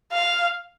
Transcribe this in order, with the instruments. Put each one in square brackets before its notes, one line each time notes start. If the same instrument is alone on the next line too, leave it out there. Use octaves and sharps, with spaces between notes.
[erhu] F5